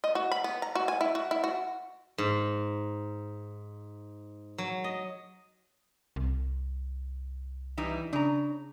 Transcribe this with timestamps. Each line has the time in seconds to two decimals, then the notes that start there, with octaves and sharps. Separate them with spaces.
0.04 D#5
0.15 F#4
0.32 B5
0.44 B3
0.62 A#5
0.75 F#4
0.88 G#5
1.01 E4
1.15 F#4
1.31 E4
1.44 F#4
2.18 G#2
4.58 F#3
4.84 D#5
6.16 C2
7.77 E3 G3 D#4
8.13 C#3 D4 A#5